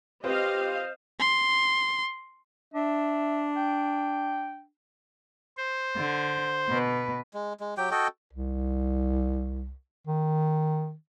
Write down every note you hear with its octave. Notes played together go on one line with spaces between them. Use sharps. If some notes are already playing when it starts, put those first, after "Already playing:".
C4 F4 G4 B4 C5 D#5 F5
C6
D4 E5
G5
C5
D3
B2 B4
G#3
G#3
F#3 G4 G5
F#4 A4 D#5 G5
C2
D#3